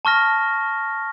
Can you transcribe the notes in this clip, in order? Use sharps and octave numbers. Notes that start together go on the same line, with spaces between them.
A5 C#6 F6 A#6